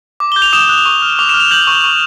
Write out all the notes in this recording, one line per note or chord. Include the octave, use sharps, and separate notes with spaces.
D6
G7
G6
F7
D#6 E7
F#6
C#6
F6
D6 F7
E7
F6
F7
G6 F#7
C#6
C#6